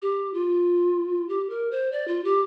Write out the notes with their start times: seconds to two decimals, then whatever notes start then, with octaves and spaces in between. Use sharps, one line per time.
0.02 G4
0.34 F4
1.29 G4
1.50 A#4
1.71 C5
1.92 D5
2.08 F4
2.24 G4